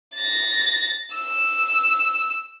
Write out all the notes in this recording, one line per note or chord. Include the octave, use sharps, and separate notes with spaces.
A6 A#6
E6